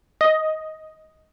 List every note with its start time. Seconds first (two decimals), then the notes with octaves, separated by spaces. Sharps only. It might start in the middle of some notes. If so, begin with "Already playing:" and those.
0.21 D#5